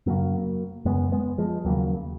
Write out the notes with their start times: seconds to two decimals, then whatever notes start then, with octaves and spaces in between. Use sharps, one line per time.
0.06 F#2 C#3 F#3 A#3
0.85 F#2 C#3 G#3 B3
1.12 G#3 B3
1.38 F3 G#3
1.65 D#2 C#3 F#3 A#3